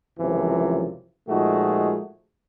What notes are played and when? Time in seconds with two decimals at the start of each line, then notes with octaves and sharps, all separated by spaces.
0.19 C#2 F#2 C3 E3 F3
1.28 A#2 F3 G#3 A3 D#4 F#4